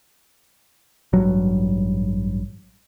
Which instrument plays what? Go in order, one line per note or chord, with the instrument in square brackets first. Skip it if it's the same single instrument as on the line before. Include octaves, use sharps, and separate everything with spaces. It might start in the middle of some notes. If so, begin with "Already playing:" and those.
[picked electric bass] A1 G2 F#3